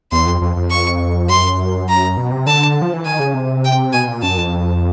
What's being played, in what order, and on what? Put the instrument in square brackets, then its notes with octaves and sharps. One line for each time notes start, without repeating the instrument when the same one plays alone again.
[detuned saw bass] E2 [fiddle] C6
[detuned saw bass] F2
F2
F2
[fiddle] C#6
[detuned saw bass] F#2 [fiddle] C6
[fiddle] A#5
[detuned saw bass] B2
C3
[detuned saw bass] D3 [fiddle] A5
[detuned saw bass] F3
E3
[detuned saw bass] D#3 [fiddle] G#5
[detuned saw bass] C#3
C3
[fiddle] G5
[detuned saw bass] B2 [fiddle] G#5
[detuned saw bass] A#2
[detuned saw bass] F#2 [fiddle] A5
[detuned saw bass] F2